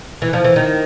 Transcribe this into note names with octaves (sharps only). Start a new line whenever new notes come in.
E3
F3
E3
D#3